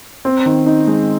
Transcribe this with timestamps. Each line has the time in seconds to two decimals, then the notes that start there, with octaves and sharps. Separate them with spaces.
0.25 C4
0.46 D#3
0.66 D#4
0.88 G#3